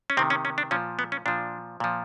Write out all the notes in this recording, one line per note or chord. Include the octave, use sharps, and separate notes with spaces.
C#4
C3 D#3 C4
C#4
C#4
D4
A#2 F3 C#4
B3
C#4
A#2 F3 D4
A#2 F3